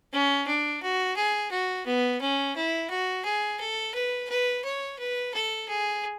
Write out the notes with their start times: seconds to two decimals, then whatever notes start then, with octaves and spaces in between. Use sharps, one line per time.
0.12 C#4
0.47 D4
0.82 F#4
1.16 G#4
1.51 F#4
1.86 B3
2.21 C#4
2.56 E4
2.90 F#4
3.25 G#4
3.60 A4
3.94 B4
4.29 B4
4.64 C#5
4.99 B4
5.34 A4
5.68 G#4